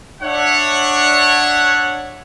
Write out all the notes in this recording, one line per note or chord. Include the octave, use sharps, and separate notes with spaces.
D4 C#5 E5 F#5